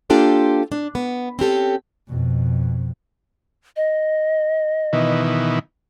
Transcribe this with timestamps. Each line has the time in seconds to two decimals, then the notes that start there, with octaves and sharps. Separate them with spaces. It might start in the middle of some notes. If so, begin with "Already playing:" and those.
0.10 A#3 D4 F4 G4 A4 C5
0.72 D4
0.95 B3
1.39 C4 C#4 G4 A4
2.08 F2 B2
3.76 D#5
4.93 B2 D#3 E3